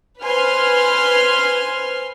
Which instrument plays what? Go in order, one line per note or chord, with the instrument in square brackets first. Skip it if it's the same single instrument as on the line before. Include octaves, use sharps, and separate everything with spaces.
[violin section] B4 C5 G#5 C6 F6